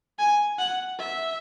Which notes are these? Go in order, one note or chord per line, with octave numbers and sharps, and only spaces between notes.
G#5
F#5
E5